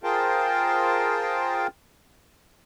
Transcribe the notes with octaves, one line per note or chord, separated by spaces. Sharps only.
F4 G#4 A#4 C5 G5 A5